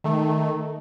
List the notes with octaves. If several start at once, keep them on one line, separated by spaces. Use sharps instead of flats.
D#3 A3